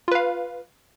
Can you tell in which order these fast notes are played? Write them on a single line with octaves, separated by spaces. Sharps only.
F4 B4 F5